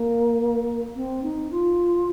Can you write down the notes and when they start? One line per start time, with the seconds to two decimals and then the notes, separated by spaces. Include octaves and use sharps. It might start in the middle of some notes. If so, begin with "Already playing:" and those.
Already playing: A#3
0.95 C4
1.23 D#4
1.51 F4